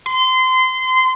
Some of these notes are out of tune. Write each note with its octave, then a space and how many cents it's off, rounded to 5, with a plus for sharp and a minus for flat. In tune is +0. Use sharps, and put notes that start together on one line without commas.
C6 -25